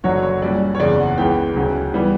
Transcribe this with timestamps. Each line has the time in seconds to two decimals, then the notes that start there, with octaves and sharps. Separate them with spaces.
0.04 F#1 F#2 D3 F#3 C#5
0.22 C#5
0.41 A#1 A#2 G3 C#4 D5
0.75 C#5
0.79 F#1 E2 C#3 D5
0.99 F#5
1.17 C#2 C#3 E3 B3 G5
1.56 D2 C#3 F#3 C#4
1.94 E3 G3 B3